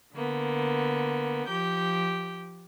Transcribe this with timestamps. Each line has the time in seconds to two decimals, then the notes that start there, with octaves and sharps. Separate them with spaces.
0.14 D3 A#3 B3
1.48 F3 G4 G6